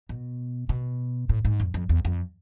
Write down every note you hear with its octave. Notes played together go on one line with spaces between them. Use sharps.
B2
B2
A2
G#2
F2
F2
E2
F2